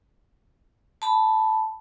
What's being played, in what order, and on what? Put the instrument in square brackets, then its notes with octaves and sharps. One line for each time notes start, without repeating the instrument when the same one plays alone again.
[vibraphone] A5 B5